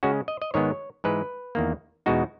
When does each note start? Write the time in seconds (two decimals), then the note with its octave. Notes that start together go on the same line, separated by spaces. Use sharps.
0.03 C#3 G#3 C#4 F#4
0.28 D#5
0.42 D#5
0.54 G#2 D#3 G#3 B3 C#5
1.04 G#2 E3 G#3 B4
1.55 E2 D#3 A#3
2.06 E2 B2 G#3 D#4 F#4